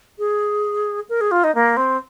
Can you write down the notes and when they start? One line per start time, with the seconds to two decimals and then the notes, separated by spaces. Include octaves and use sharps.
0.19 G#4
1.09 A#4
1.21 G#4
1.31 F4
1.44 D#4
1.55 A#3
1.77 C4